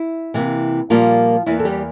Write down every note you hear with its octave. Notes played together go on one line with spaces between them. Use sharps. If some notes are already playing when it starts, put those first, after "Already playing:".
Already playing: E4
C3 E3 A#3
A#2 F3 G3 A#3 F4
E2 E3 A#3 E4
A4
G3 G4